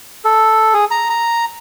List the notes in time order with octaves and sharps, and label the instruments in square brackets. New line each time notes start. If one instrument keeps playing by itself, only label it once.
[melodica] A4
G#4
A#5
A#5